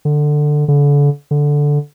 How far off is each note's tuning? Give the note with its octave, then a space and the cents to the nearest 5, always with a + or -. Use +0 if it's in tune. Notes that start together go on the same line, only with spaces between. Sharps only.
D3 +15
D3 -35
D3 -5